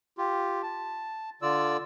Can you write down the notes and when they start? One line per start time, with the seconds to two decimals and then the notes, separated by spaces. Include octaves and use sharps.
0.18 F4 G4
0.63 A5
1.42 D3 F4 D5 E6